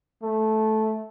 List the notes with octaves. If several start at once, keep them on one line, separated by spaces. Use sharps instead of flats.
A3